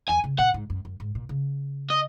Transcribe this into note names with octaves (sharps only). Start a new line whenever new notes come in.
E2 G#5
C#3
A#2 F#5
G#2
F#2
F#2
G#2
A#2
C#3
D#5